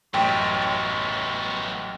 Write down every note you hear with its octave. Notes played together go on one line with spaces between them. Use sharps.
A1 F#2 A3 B3 G5 C#6